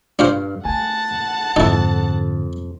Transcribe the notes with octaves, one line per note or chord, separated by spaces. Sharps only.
G2 D4 F4 C5 F5
A3 F#5 G#5 A5
F2 G#2 D3 D#4 E4